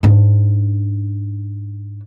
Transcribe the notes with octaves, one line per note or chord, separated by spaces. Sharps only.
G#2 D4